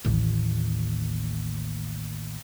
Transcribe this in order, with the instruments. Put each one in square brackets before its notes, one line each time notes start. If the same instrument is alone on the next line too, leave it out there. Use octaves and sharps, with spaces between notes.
[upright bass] A1 D#2